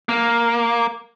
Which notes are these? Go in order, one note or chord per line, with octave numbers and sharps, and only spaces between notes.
A#3